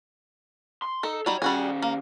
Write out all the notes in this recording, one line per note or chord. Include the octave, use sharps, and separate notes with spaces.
C6
D#4 A4
F#3 G3 D#4 C#5
D#3 G3 C#4 F#4 G#4
A#3